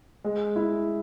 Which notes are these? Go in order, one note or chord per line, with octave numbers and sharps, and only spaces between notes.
G#3
E4